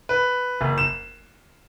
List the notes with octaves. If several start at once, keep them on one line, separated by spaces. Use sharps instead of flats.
B4
F#1
E7